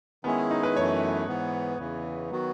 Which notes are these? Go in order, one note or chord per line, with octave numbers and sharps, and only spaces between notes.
D#3 G#3 B3 C#4 E4 G#4
D#4
B4
F#2 E3 A3 C#5
G#2 E3 B3
E2 C#3 E3
D#3 F#3 B3 F#4